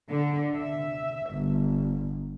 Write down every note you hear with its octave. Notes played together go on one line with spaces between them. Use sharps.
D3
E5
G1